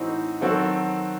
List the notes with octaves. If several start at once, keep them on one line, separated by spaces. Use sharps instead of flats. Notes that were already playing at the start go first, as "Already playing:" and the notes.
Already playing: A2 E3 C4 D#4 F#4
D#3 F#3 C4 F#4 A4